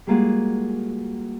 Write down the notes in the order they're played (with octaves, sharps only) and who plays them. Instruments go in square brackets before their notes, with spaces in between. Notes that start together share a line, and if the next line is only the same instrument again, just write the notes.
[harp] G3 G#3 A#3 F4 F#4 G#4